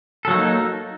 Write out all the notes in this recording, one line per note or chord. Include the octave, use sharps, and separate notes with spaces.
F#3 A#3 D#4 A4